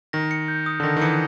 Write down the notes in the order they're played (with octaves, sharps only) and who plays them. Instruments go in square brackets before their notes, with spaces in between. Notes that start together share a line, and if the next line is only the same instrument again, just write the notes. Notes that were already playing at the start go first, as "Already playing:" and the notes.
[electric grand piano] D#3 [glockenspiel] A#6
[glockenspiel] C#7
G6
D#6
[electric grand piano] D3
[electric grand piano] D#3 [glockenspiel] A#6
[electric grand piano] D#3
[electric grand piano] E3 [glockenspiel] C#7